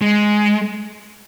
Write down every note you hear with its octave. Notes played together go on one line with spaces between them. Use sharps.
G#3